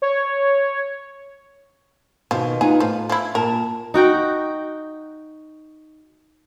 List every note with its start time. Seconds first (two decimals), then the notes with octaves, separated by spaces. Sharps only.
0.02 C#5
2.31 B2 D#3 F3
2.61 B3 D#4 F4 G#4
2.80 A2 F3
3.10 F3 E4
3.35 A#2 A#4 A5
3.94 D#4 F#4 G5